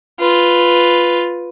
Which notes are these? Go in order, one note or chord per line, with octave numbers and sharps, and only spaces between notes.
F4 B4